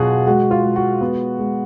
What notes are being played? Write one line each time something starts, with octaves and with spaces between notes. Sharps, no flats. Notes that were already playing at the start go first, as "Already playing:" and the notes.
Already playing: B2 F#3 F4 F#4 G#4
G#3 F#4
F4
G#3
F#4
B3
G#3